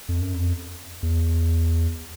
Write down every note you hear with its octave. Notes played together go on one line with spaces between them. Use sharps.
F2
F#2
F2
E2